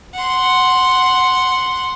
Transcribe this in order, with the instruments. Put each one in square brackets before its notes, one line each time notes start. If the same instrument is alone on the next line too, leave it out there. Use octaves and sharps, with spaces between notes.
[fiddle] F#5 C6